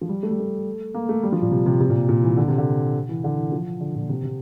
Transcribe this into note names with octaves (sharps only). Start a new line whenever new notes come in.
F3
G3
A3
G3
A3
A#3
A3
G3
F3
A#2
C3
C3
C3
A#2
A#2
E3
D3
C3
D3
E3
D3
E3
F3
D3
A#2
C3
C3